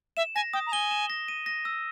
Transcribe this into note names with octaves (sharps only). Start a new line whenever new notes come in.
E5 E7
G#5 A#6
G5 D#6
A#5
G#5 G7
E7
A#6
D#7
A#6
E6